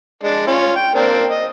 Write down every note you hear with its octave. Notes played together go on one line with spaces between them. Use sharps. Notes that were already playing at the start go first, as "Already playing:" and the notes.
G#3 D4
C#4 F4
G5
A#3 C4 D4
D#5